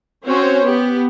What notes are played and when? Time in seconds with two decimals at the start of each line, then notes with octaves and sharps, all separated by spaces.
0.24 C4 C#4 F#4 C5 C#5
0.63 B3 G4